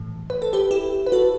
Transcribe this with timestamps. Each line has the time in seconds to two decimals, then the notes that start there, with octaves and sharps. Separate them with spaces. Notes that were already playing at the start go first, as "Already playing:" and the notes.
Already playing: A2 E3
0.30 B4
0.42 A4
0.53 G4 B4
0.71 E4 G4
1.06 B4
1.12 F#4 A4